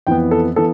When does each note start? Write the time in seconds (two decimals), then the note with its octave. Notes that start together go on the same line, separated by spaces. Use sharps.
0.07 F2 E3 B3 G5
0.31 A4
0.56 E3 B3 A4